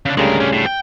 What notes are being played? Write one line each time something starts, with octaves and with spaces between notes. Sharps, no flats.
C#3 D4
D2 C#3 G3 G#3 A#4
C#4 G4
A2
G5